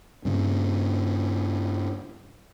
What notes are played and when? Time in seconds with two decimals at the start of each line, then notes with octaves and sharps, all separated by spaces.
0.25 G2 C#3